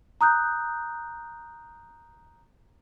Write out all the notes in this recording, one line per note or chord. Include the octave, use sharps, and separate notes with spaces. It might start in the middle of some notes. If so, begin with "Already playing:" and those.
A#5 D#6 F#6 G6